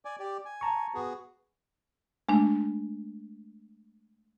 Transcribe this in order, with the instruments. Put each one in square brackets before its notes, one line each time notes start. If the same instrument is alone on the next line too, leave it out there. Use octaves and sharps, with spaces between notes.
[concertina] D5 G#5
G4 D5
G#5
[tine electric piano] A5 A#5 C#6
[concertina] B3 F#4 G#4
[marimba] G#3 A3 D4